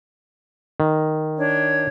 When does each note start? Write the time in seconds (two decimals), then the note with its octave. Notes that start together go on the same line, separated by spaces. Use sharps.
0.80 D#3
1.38 D4 C#5